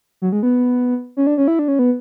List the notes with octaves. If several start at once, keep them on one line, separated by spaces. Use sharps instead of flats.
F#3
G#3
B3
C#4
D4
C#4
E4
D4
C#4
B3